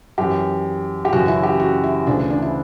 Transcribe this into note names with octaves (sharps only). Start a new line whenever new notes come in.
F#2 E3 G4
G4
F#2 C#3 E3 F#4
E4
G4
F#4
E4
D2 C#3 E3 D4
D4
E4